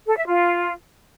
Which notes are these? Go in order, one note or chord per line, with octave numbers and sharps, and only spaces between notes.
A4
E5
F4